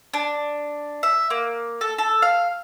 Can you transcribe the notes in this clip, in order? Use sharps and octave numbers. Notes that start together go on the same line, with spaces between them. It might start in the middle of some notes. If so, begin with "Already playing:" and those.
D4
E5
A#3
A4
A4
F5